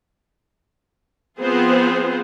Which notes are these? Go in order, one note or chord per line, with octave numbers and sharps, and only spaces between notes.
F3 B3 C4 F4 G#4 C5